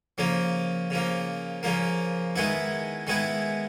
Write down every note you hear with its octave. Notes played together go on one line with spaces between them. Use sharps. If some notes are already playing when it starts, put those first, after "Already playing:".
C#3 F3 A#3
C#3 F3 A#3
C#3 F3 A#3
D#3 G#3 B3 E4
D#3 G#3 B3 E4